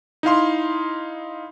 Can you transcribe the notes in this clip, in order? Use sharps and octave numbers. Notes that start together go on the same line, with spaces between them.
D#4 E4 F5 C6